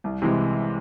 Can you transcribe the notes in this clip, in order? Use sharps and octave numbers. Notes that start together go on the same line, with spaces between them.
C2
C3 E3 G#3